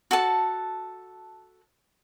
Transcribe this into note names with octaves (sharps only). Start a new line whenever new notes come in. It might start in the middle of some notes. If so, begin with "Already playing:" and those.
F#4 A4 A5